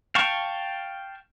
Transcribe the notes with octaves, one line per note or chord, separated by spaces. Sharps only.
F5 G5 A5 C#6